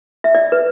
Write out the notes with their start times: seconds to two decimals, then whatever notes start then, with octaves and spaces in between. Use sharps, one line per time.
0.24 E5
0.35 D5
0.52 B4